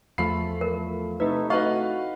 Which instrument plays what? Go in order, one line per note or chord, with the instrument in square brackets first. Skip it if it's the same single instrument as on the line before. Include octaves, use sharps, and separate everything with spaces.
[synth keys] E2 F3 A3 [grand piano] F5 B5 C7
[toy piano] A#4
[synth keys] C3 A3 E4 [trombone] D#4 [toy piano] B4
[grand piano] D#4 B4 F5 [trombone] F#4 [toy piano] D#5 C#6